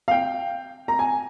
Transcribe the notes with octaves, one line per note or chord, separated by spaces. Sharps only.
F5
G5
A#5
G#5